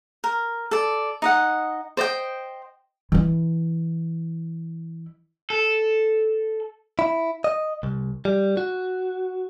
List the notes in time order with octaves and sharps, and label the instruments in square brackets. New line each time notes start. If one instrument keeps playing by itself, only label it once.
[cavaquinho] A#4
A4 D5
D#4 D#5 F#5
C5 D5 D#5 G5
[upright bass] E3 E4
[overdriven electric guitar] A4
[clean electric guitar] E4
D#5
C2
G3
F#4